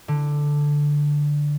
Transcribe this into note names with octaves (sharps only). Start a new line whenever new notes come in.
D3